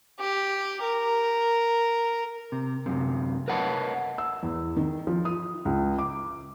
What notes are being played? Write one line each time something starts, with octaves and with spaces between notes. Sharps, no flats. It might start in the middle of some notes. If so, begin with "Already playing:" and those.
G4
A#4
C3
F#2 C3
A#4 B4 C#5 D#5 F#5 A5
E6
E2
D#3
F3
D#6
C#2
D6